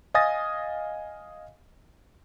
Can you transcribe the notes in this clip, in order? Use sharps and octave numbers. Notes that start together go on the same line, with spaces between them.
D#5 F5 G#5 D#6 A6 A#6